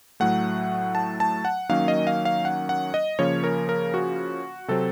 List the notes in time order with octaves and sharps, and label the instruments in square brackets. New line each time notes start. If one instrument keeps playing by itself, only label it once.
[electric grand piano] A2 F#3 A3 F#5
A5
A5
F#5
D#3 F#3 A#3 C#4 F5
D#5
F5
F5
F#5
F#5
D#5
C#3 F3 A#3 C#4 C#5
A#4
A#4
F#4
C3 F#3 C4 A4